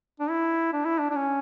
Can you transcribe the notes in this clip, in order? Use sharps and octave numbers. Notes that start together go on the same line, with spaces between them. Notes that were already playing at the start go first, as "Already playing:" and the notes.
D4
E4
D4
E4
D4
D4
C#4